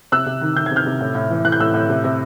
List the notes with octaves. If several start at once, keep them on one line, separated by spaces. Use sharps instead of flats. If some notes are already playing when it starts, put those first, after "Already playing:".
C3 E6 F#6
C3
D#3
D#3 G6
C3 G#6
F6 G6
C3
A2
A2
E3
E3 F#6
G6
A2 E6 F#6
A2
C3
C3